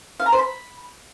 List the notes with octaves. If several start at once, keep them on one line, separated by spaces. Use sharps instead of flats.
F5
A#5
C5
B5